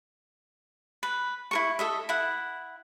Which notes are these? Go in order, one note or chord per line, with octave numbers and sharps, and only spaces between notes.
B4
E4 A#4 C#6
A4 D#5 E5
E4 F#5